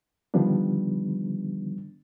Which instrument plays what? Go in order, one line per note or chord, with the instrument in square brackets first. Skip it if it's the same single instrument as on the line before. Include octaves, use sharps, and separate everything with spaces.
[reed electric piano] D3 D#3 F3 G3 B3 D4